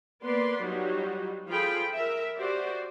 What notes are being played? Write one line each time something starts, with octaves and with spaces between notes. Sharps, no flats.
A#3 B3 B4 D5 C6
F#3 G3 D#4 F4 F#4
F3 F4 G#4 A4 G5 B5
A#4 E5
F#4 G4 C5 D5